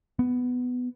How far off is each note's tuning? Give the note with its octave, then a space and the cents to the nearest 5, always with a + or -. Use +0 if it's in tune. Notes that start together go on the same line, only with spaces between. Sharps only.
B3 +10